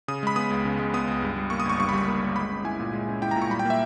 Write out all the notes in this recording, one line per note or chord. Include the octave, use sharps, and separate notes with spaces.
C#3 D#6
G#3 B5
B3 D#6
C#2
C#3
G#3
B3 D#6
C#2
G2
G3
A#3 C#6
D#6
G1 C#6
G2 C#6
B5
G3 C#6
A#3
G1
G#3 B5
C#4
E4 G#5
A#2
G#3
C#4
E4 G5
A#5
A#2
C#6
G3 B5
G5
A#3 E5